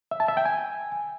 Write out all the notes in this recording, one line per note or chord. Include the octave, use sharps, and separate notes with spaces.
E5
A5
E5
G5
G#5